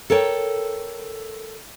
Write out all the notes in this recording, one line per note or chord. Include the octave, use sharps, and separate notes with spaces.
A4 A#4 C#5 G5